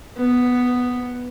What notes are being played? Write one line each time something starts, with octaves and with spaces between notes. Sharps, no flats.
B3